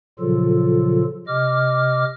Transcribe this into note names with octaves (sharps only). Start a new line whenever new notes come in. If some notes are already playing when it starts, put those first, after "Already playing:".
A#2 C#3 F3 F#3 F4 A4
C3 D#5 D6 F6